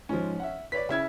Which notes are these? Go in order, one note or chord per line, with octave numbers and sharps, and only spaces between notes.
G#2 F3 C#4
E5 F#5
B4 C#5 D5 B6
C#3 C#4 E4 G#6